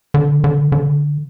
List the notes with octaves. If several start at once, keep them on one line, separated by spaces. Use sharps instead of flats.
D3
D3
D3